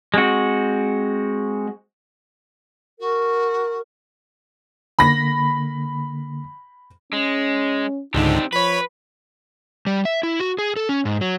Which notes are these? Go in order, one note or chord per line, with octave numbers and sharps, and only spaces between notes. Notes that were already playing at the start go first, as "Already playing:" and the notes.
G#3 C4 F#4
F#4 A#4
D3 A#3 B5 A#6
G#3 C#4
C#2 G#2 D3 C4 D4 D#4 G4
F3 B4 C#5 B5
G3
E5
E4
F#4
G#4
A4
C#4
G#2
F#3